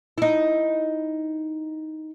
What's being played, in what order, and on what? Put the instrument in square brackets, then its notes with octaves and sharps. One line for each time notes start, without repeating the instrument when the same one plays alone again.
[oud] D#4 E4